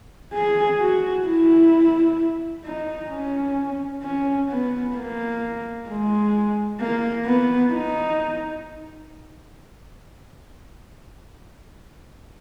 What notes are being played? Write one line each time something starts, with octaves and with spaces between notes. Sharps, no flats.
G#4
F#4
E4
D#4
C#4
C#4
B3
A#3
G#3
A#3
B3
D#4